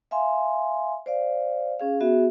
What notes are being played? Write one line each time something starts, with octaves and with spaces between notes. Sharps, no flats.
E5 F5 G#5 C6
C5 D5 F5
C#4 G#4 F5
B3 F#4 G#4 E5